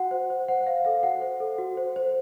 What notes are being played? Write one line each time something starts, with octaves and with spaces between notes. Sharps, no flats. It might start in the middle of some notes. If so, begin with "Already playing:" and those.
Already playing: F#4 F#5
C5
C5
C5 F#5
C5 F5
A4 F5
F#4 F#5
C5
A4
F#4
C5
C5